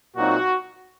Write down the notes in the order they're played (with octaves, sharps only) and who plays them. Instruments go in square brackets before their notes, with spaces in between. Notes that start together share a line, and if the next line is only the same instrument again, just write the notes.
[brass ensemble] A#2 F#3 C4 D#4 F#4